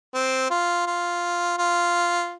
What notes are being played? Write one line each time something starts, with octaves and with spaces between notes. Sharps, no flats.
C4
F4
F4
F4